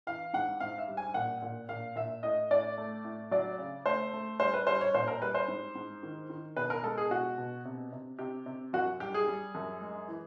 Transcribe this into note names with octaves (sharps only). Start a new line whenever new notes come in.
E3 F5
G#2 F#5
G#2 F5
E5
G3
G#5
A#2 F#5
A#2
A#2 F5
A#2 E5
A2 D#5
A2 D5
A3
A2
F#3 D5
C#3
A3 C5
A3
G3 C5
B4
G3 C5
C#5
A#2 C5
A#4
G3 B4
C5
G#2
G#2
D#3
D#3
B2 B4
A#4
G#3 A4
G#4
B2 F#4
B2
C3
C3
C3 G4
C3
F#2 F#4
G3 G4
G#4
G3
F#2
G#3
E3